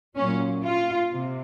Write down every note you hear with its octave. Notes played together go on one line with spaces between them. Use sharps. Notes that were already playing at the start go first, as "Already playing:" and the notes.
A#2 F#3 C#4
F4
C3